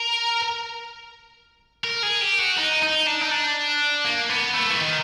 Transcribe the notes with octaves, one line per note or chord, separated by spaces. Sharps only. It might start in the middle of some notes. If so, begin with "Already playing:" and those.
Already playing: A#4
A#4
G#4
G4
F#4
D#4
D#4
D4
D#4
D4
A#3
B3
A3
E3
D#3